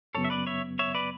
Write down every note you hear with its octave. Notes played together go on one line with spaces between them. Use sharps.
F#2 C#3 F#3 B3 A4 C#5
E5
B4 D5
C#5 E5
C#5 E5
B4 D5